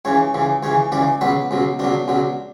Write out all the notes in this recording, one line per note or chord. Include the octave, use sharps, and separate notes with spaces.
C#2 C#3 E3 C#5
C#2 C#3 E3
C#2 C#3 E3 C#5
C#2 C#3 E3 D5
C#2 B2 F#3 B4
C#2 B2 F#3
C#2 B2 F#3 D4
C#2 B2 F#3